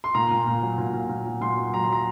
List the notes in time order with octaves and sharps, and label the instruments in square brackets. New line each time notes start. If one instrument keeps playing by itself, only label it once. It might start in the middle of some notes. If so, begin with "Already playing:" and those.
[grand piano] C6
A#2 A#5
A#2
A#2
F#3
A#2
A#2
A#2
F#3
A#2 C6
F#3
F#3 A#5
C6
F#3 A#5